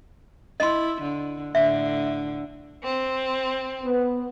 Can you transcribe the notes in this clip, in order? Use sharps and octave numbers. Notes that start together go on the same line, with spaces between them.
E4 D#5 C6
D3
A2 D3 E5
C4
B3